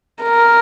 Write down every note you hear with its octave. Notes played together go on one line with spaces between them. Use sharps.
A#4